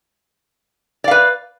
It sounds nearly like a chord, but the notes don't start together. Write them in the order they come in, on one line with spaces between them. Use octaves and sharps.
D5 F5 B4